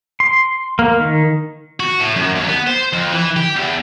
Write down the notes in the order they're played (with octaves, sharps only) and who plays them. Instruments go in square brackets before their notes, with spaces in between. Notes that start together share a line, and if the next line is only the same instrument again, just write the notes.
[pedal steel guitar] C6
A#3
D#3
[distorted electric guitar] F#4
A2
F#2
D#2
B3
C5
F2
E3
G4
E2